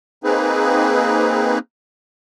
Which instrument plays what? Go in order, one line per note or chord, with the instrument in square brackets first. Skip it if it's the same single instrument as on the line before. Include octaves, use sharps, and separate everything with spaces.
[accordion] A#3 C4 D#4 G#4 B4